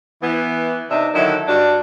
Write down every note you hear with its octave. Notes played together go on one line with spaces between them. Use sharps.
E3 B3
C3 D4 D#4 E5
D3 D#3 F#3 E4
G2 D4 F#4